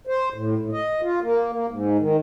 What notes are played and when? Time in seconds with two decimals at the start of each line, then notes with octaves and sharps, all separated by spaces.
0.07 C5
0.34 A2
0.59 A2
0.72 D#5
1.02 F4
1.22 A#3
1.53 A#3
1.69 G#2
1.99 D#3